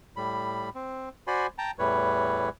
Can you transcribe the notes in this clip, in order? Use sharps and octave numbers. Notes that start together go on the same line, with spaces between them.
A2 G3 B5
C4
F#4 C5 D5 G#5 B5 C6
G5 A5 A#5
E2 A2 E3 G3 B4 C#5